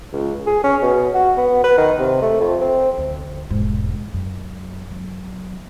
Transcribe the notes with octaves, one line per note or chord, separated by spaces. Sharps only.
C#2
G#4
C#4
B2
F#4
B3
B4
D#3
C3
A3
F2
C4
D2
E1 G#2
F#2
F#3